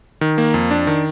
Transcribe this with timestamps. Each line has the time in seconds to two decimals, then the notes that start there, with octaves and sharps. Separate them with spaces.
0.21 D#3
0.38 A#3
0.54 F2
0.71 D4
0.87 D#3